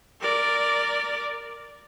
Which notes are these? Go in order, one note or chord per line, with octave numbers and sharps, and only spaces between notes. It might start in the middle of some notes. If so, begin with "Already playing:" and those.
A#4 D5